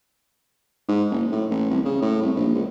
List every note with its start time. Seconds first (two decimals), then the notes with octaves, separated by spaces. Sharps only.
0.88 G#2
1.11 F#1
1.32 A2
1.51 A1
1.70 C2
1.85 C#3
2.02 A2
2.22 C2
2.36 A#1
2.55 C#2